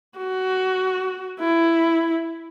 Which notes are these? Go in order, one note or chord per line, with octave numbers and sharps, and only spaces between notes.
F#4
E4